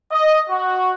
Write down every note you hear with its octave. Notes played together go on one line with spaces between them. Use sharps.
D#5
F#4